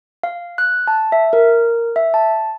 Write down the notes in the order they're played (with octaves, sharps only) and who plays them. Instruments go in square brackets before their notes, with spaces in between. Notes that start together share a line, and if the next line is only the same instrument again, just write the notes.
[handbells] F5
F#6
A5
E5
A#4
E5
A5